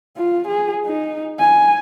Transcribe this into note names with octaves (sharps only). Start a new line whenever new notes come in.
F4
G#4
D#4
G#5